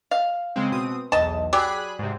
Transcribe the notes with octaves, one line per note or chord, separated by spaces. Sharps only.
F5
C#3 G#3 C4
B2 C4 D#6
B1 E2 D#5 A5
F#3 G4 G#4 D5 B5 F#6
G#2 C3